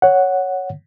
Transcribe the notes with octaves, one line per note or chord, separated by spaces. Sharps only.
C#5 F#5